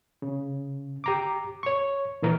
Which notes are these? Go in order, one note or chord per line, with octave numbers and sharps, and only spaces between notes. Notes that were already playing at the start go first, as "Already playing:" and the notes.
C#3
G4 A#5 D6
C#5 C#6
A#2 E3 A#4